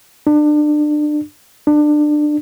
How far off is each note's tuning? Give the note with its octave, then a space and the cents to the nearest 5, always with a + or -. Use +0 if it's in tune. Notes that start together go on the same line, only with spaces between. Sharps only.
D4 +30
D4 +25